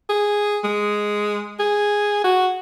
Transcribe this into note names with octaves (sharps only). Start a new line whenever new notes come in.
G#4
G#3
G#4
F#4